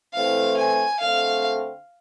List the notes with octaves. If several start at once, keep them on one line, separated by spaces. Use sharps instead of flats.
A2 E3 A3 C4 F5
G#5
D3 A3 C4 F5